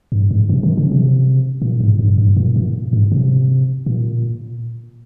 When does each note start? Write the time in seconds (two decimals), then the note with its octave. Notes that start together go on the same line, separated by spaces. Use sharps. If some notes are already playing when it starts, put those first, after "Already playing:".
0.12 G2
0.31 G#2
0.49 C3
0.63 D#3
0.77 C#3
0.92 C3
1.62 A#2
1.80 G#2
1.99 G2
2.18 G2
2.37 A#2
2.56 A#2
2.93 G#2
3.12 C3
3.86 A#2